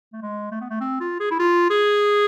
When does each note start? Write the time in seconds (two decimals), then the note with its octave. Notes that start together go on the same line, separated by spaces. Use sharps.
0.13 A3
0.22 G#3
0.51 A3
0.61 B3
0.70 A3
0.81 C4
1.00 F4
1.20 G#4
1.31 E4
1.39 F4
1.70 G#4